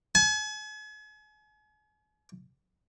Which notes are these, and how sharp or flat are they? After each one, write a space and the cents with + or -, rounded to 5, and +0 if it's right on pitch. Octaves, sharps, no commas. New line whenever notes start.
G#5 +40